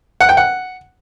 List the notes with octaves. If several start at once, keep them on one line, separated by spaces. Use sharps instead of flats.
F#5
G5
F#5